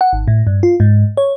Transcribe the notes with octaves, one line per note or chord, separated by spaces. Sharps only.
F#5
G#1
A2
G2
F4
G#2
C#5